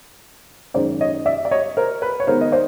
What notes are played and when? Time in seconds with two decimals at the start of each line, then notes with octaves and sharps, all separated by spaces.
0.74 F#2 D#3 G#3 C#4 C5 D5
1.01 C#5 D#5
1.26 D5 E5
1.45 D5
1.51 C#5 D#5
1.77 A#4 C5
2.02 B4
2.20 C#5
2.27 D#3 G#3 B3 A#4 C5
2.41 D#5
2.52 C5 D5